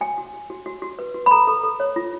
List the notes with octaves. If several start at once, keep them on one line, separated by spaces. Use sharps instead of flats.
F#4 G#5
F#4
F#4
F#4
F#4
F#4
B4
F#4
B5
A4 A#5
A4
A4
C#5
F4